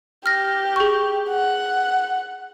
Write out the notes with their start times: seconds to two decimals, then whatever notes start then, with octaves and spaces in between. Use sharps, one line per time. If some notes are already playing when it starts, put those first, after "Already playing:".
0.26 G4 F6 A#6
0.76 G#4 C#6
1.30 F#5